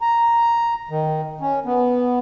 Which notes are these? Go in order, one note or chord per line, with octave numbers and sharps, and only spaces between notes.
A#5
D#3
C#4
B3